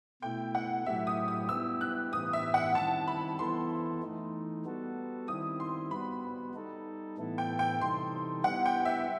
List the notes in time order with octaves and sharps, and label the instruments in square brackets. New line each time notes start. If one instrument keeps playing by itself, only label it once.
[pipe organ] B2 A3 E4 [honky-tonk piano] G5
[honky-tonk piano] F#5
[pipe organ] A2 F#3 A3 E4 G4 [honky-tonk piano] E5
[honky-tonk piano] D#6
D#6
[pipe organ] G3 B3 E4 G4 [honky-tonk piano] E6
[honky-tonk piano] F#6
[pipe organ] A2 E3 B3 E4 G4 [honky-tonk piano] D#6
[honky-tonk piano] E5
F#5
[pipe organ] D#3 G3 C4 E4 [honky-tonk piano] A5
[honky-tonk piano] B5
[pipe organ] E3 B3 E4 A4 [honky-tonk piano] C6
[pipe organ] E3 A3 D#4
G3 B3 F#4 A4
[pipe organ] D#3 G3 C4 E4 [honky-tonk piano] D#6
[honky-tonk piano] C6
[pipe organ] G3 B3 F#4 [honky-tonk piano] B5
[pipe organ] G3 D#4 A4
A2 E3 B3 E4 A4
[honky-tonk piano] G5
G5
[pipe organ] C3 E3 G3 D#4 A4 [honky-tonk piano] C6
[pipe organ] G3 B3 E4 G4 [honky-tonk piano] F#5
[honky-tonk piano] G5
E5